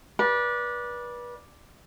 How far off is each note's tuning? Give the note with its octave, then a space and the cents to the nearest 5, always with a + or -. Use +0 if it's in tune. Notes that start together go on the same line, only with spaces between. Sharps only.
B4 -30 D5 +0